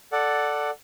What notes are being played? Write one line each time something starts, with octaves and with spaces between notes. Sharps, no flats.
A4 D5 F#5